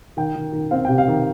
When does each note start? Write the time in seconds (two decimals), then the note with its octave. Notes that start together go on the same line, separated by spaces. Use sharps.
0.17 D#3 G5
0.35 D#3
0.53 D#3
0.71 C4 F5
0.85 C3 G5
0.98 F5
1.08 D#3